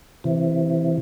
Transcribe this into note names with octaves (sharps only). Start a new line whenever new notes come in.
C3 E3